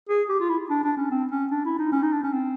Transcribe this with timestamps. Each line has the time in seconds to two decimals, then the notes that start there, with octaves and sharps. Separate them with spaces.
0.09 G#4
0.29 G4
0.40 F4
0.50 E4
0.70 D4
0.84 D4
0.97 C#4
1.11 C4
1.31 C#4
1.51 D4
1.65 E4
1.79 D#4
1.92 C#4
2.03 D#4
2.12 D4
2.24 C#4
2.33 C4